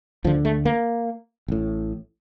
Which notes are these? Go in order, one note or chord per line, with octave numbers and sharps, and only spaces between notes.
D2 D3 F3
A3
A#3
A1 A2